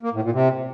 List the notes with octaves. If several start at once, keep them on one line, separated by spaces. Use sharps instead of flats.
A#3
A2
A#2
C3